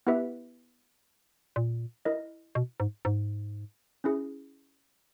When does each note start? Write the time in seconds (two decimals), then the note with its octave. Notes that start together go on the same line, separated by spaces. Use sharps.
0.07 B3 E4 G4 B4 E5
1.56 A#2
2.05 E4 A#4 D#5
2.55 B2
2.80 G#2
3.05 G#2
4.04 C#4 E4 G#4